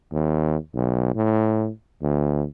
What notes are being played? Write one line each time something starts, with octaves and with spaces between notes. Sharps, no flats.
D#2
B1
A2
D2